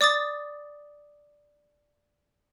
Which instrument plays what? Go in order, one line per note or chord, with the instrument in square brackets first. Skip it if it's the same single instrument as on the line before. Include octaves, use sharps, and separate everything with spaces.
[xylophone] D5 D6 D#6 A6